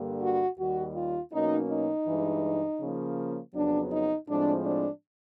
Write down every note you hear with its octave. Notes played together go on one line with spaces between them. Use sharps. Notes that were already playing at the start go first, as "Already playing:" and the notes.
Already playing: G2 D3 G3 A#3
F#4
D#2 D#3 G3 F#4
F4
B2 F#3 A#3 C#4 D#4
D#4
G2 E3 G#3
C#3 F3 A#3 C#4
F2 C#3 F#3 B3 D4
D#4
A2 F3 G#3 C4 D4
D4